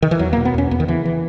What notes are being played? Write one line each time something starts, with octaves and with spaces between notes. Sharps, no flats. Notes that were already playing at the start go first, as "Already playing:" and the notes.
D#3
E3
E2 F#3
B2 A#3
B3
E2 C#4
E2 B3
D#3
C#3 E3
E3